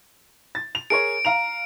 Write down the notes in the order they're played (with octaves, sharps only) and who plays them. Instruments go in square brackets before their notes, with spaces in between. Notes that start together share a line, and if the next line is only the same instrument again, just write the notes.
[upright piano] A6
F7
[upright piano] G#4 A#4 C#5 [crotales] D7
[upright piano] F5 A#5 F7